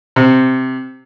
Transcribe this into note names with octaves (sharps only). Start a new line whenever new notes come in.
C3